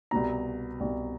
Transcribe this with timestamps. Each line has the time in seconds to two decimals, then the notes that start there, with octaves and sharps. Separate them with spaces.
0.11 C2 B2 A#5
0.80 C2 B2